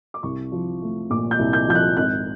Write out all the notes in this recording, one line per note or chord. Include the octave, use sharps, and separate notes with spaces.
D6
C2 C#6
F3
A3
A#2 D6
G6
C2
G6
F3 G6
F#6
G#1 F#6